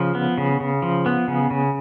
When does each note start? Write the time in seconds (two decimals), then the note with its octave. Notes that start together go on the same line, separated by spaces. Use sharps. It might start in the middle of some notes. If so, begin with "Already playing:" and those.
Already playing: C#3 F3
0.15 B3
0.38 C#3
0.60 C#3
0.82 F3
1.06 B3
1.28 C#3
1.50 C#3